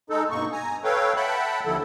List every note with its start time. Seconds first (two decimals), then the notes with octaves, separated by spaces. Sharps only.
0.10 G#3 D#4 A4
0.30 G2 B2 A#3 D#4 C#6
0.52 G#5 A#5
0.84 A4 B4 C#5 F5 G5
1.16 E5 F#5 G5 A5 B5
1.66 D#2 D3 F3 E4 A4